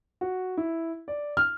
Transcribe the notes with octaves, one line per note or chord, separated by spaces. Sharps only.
F#4
E4
D5
F6